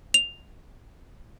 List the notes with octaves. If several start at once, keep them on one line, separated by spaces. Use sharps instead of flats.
F7